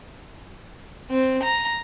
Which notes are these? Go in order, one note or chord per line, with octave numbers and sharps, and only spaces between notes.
C4
A#5